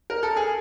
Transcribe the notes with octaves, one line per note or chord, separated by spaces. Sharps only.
A#4
A4
G#4